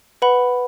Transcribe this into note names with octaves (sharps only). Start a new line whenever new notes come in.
B4 F#5 B5